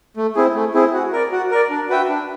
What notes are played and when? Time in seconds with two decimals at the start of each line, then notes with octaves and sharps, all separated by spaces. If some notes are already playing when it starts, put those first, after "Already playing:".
0.17 A3
0.36 C4 E4 G#4
0.55 A3
0.74 C4 E4 G#4
0.93 F#4
1.13 A#4 D5
1.32 F#4
1.51 A#4 D5
1.70 D4
1.89 F#4 B4 E5 G5
2.09 D4